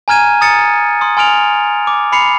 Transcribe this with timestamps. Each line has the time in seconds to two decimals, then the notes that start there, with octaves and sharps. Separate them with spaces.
0.08 G#5 A#5 F6 G#6 D#7
0.41 A#5 D#6 A6 C#7
1.01 C6 D#6
1.17 G#5 C6 F6 D7 F7
1.87 D6
2.12 B5 C7 C#7 F7